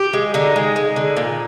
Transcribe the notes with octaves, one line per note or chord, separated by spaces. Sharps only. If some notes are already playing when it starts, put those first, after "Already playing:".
Already playing: G4
G#3
D3 D#4
G#3
G#3
D3
A#2